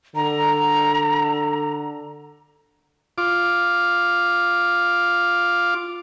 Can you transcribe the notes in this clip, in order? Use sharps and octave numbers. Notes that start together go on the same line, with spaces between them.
D3 A#5
F4 D6